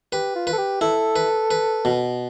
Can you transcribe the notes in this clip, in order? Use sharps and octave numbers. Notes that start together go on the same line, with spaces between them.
G4 B4
F4
B4
A4
G4
E4 A4
B4
B4
B2